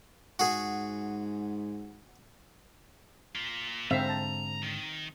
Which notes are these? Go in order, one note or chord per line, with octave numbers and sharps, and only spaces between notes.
G#2 F#4 G#4
A#3 F4
G#2 D3 C4 E5 F5 A#5
A5
D#3